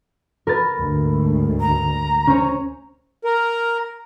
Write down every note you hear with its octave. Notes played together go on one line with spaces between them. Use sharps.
A#4 B4 A6
D2 G#2
A#5
C#4 C5 C#5
A#4